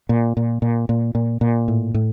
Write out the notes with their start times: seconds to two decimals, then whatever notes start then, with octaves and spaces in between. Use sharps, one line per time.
0.09 A#2
0.37 A#2
0.62 A#2
0.89 A#2
1.15 A#2
1.41 A#2
1.68 A2
1.94 A2